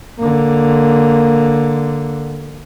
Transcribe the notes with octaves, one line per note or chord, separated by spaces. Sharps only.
D3 A#3